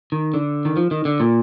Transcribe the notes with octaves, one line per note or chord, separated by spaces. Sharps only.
D#3
D3
D#3
F3
D#3
D3
A#2